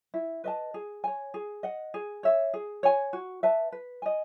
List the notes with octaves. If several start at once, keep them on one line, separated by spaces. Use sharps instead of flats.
E4
B4 D#5 A5
G#4
C#5 G#5
G#4
D#5 F#5
G#4
C#5 E5
G#4
C#5 G#5
F#4
B4 E5 A5
B4
D#5 G#5